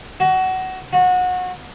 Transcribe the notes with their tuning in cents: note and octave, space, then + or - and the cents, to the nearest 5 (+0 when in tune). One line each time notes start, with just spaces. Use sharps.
F#4 +20
F#4 -25